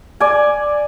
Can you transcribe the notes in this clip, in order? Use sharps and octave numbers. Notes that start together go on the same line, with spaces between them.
D5 G#5